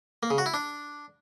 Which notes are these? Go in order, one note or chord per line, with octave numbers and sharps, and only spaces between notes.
A#3
C#3
F#4
E4
D4